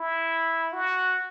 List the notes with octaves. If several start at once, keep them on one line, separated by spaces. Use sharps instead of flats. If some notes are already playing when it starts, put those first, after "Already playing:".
Already playing: E4
F#4